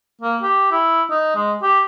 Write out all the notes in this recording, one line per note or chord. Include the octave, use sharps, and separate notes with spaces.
A#3
G4
E4
D#4
G#3
G4